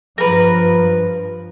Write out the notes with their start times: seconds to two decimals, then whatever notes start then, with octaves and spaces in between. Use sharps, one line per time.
0.18 G2 F3 A#4 B4